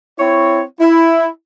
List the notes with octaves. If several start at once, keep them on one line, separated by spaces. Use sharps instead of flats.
C4 E4 C#5
E4